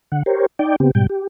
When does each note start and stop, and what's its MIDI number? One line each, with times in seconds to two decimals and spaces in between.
0.12 0.23 50
0.12 0.23 78
0.26 0.46 67
0.26 0.46 70
0.26 0.46 72
0.26 0.46 73
0.59 0.76 63
0.59 0.76 74
0.59 0.76 79
0.80 0.91 49
0.80 0.91 59
0.80 0.91 60
0.80 0.91 67
0.95 1.07 44
0.95 1.07 47
0.95 1.07 55
0.95 1.07 79
1.09 1.27 67